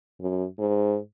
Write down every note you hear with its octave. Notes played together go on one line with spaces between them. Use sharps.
F#2
G#2